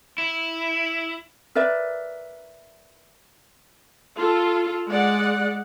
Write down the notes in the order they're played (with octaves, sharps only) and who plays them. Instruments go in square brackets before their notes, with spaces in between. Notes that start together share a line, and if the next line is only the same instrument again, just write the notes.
[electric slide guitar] E4
[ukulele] A#4 B4 D5 E5
[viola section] F4 A4
G#3 D5 F#5